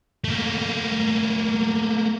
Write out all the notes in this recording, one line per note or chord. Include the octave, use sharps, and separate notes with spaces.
A3 A#3